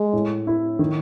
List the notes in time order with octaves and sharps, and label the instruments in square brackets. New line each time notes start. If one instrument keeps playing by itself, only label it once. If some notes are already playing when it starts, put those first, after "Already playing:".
Already playing: [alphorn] G#3
[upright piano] A2
E4
D#3